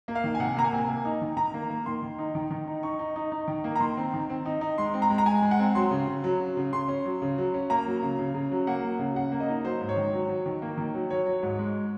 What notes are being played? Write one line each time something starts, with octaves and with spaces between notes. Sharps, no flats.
A#3
F5
D#3
G#5
C3 F#5
A#3 A#5
G#5
C3
A#3
D#4
D#3
D#3 A#5
A#3
A#3
D#3 C6
D#3
D#4
D#3
D#3
D#4
D#4 C#6
D#4
D#4
D#4
D#3
A#3
A#5
D#3 C6
C4
D#3
C4
D#4
D#4
G#3 C6
C4
A#5
G#3
A#5
G#3 G#5
G#3
F#5
C4
F#3 C6
C#3
C#3
F#3
F#3
C#3
C#3 C6
C#4
F#3
C#3
F#3
C#4
A#3 A#5
F#3
C#3
C#3
C#3
F#3
A#3 F#5
F#3
C#3
C#3 F#5
A#3
D#5
D#4
F#3 C5
G#2
C#5
D#3
F#3
F#3
D#3
A#3
D#3
F#3
F#3 C#5
F#3
G#2
G#3